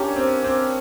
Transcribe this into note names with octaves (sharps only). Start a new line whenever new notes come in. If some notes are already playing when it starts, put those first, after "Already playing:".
Already playing: A#3 C#4 D4 G4
C4
C4